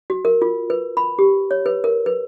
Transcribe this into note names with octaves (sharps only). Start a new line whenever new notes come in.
F#4
A#4
F4
B4
B5
G4
C#5
B4
A#4
B4